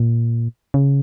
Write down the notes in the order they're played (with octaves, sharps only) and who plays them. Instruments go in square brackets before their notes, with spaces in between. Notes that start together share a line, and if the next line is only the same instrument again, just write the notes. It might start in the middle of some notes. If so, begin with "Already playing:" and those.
Already playing: [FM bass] A#2
C#3